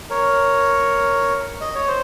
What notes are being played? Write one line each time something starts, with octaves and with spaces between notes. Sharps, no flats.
A#4 C#5
D#5
C#5
C5